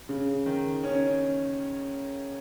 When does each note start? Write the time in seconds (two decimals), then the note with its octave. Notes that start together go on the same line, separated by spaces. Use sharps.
0.09 C#3
0.46 D#3
0.84 C#4